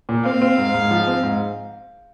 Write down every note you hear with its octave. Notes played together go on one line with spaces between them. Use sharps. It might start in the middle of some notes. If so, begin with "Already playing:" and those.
A#2
C4 F5
C4
G#2
G#2
F3
C4
G#2